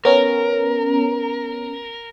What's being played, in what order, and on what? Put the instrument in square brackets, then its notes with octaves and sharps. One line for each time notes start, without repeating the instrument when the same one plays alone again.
[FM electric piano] B3 C#4 A#5 [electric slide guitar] A#4